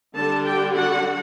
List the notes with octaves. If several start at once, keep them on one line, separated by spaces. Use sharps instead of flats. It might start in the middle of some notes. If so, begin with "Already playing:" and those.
D3 G3 D4 A4 A5
G4 G5
F#4 F#5